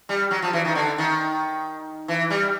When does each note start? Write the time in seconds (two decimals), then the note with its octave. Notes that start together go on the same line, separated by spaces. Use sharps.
0.09 G3
0.31 F#3
0.42 F3
0.53 E3
0.65 D#3
0.75 D3
0.98 D#3
2.08 E3
2.30 G3